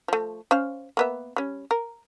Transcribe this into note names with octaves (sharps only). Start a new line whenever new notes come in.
F3 A3
C#4 C5 F5
A#3 B3 E5
G3 C#4
A#4